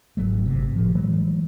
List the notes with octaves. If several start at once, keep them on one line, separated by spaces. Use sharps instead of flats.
G#1 F#3 A3
G1 C3
A2 F3
E3 F#3 G#3 A3